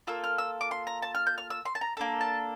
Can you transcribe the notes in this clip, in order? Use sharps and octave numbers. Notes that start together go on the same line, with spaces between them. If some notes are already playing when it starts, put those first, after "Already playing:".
A#3 F4 A4 E6
F6
E6
D6
C6
A#5
A5
F6
G6
F6
E6
C6
A5
A#5
A#3 D4 A4
A5